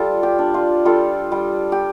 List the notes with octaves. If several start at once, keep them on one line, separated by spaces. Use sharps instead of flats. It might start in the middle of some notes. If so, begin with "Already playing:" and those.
Already playing: G3 F4 A4
G4
D4
F4
G3 F4 A4
G3
G4